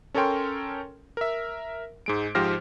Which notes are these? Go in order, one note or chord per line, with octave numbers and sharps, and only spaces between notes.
C#4 A4 A#4 C#5 G5 C6
A#4 E5
G#2 G#3 D7
G#2 F3 G4 C5 F6 A#6